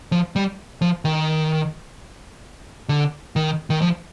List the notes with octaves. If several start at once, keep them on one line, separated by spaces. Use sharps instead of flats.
F3
G3
F3
D#3
D3
D#3
D#3
F3